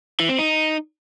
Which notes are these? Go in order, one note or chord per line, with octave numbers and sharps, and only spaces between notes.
E3
C4
D#4